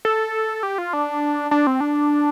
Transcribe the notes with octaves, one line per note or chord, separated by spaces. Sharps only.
A4
G4
F4
D4
D4
C4
D4